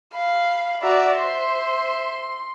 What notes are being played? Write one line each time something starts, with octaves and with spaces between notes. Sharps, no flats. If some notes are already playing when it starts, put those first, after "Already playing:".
F5 B5
F#4 D5 E5 A#5
C5 C6